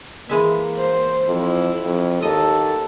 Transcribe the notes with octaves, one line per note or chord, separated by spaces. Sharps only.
E3 G#3 A#3 E5
C5
F2 E4
F2
D#2 A4 D#5